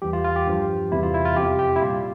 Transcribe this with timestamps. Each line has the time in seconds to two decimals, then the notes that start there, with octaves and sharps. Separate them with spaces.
0.02 E2 E3 G3 G4
0.13 F4
0.24 F4
0.36 G4
0.47 G2 F3
0.92 E2 C3 E3 G3 E4
1.03 F4
1.14 E4
1.25 F4
1.36 F2 C3 F3 G4
1.59 G4
1.76 E4
1.81 A#2 G3 F4